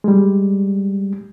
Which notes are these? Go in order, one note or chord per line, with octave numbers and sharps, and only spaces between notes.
G3 G#3